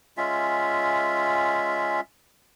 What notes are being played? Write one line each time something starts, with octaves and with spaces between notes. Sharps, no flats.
G#3 C#4 F4 E5